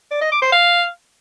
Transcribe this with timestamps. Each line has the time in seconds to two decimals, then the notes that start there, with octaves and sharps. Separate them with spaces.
0.11 D5
0.21 D#5
0.32 D6
0.42 C5
0.52 F5